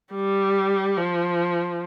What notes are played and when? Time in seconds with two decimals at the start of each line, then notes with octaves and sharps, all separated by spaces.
0.13 G3
0.97 F3